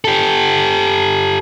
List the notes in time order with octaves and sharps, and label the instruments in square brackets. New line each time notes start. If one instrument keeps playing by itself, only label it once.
[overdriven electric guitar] G4 A4